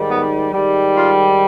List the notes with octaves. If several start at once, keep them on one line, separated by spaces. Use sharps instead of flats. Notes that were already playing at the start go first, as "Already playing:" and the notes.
Already playing: G#2 D#3 G3
B3
G#2 D#3 G3
F4